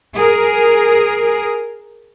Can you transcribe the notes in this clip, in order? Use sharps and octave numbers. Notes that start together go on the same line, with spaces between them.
G#4 A#4